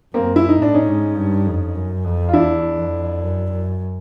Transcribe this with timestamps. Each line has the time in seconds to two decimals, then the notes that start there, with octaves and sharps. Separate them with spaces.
0.14 F#2 A#3 C4
0.36 E4
0.49 D#4
0.58 A2 D4
0.74 C#4 D#4
0.87 G#2
1.16 G2
1.46 F2
1.75 F#2
2.05 F2
2.29 F4
2.33 E2 D4 E4
2.78 F2
3.22 F#2
3.51 F#2